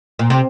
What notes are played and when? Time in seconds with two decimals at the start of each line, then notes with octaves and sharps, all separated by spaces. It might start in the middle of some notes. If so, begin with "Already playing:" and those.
0.19 A#2
0.30 C3